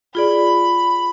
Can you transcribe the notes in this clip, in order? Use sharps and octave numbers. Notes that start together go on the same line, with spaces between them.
F4 G#4 D5 B5